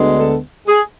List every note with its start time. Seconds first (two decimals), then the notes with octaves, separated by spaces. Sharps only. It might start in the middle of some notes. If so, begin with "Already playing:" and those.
Already playing: D2 D3 G#3 B3
0.19 A4
0.68 G#4